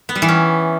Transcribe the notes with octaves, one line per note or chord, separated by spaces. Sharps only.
B3
G3
E3
C#4